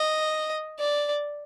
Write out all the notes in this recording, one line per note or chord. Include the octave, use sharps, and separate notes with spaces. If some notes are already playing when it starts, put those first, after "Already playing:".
Already playing: D#5
D5